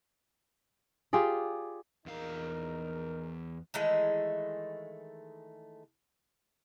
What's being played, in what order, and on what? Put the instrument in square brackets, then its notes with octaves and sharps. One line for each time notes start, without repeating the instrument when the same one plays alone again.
[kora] F4 G4 G#4 D5
[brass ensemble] A#1 D#4 A#4 [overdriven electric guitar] E2 F5
[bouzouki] D#3 E3 G#3 A3